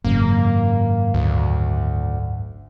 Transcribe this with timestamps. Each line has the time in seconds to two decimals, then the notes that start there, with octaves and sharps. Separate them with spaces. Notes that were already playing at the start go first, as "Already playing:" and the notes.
0.04 G#1 F#2 C#3 A#3
1.14 D2